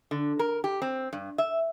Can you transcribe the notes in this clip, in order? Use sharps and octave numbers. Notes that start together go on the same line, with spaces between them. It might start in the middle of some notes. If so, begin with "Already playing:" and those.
D3
A#4
G4
C4
G2
E5